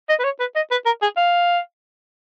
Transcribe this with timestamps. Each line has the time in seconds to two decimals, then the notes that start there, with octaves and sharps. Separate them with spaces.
0.09 D#5
0.19 B4
0.24 C#5
0.40 B4
0.56 D#5
0.71 B4
0.86 A#4
1.02 G#4
1.17 F5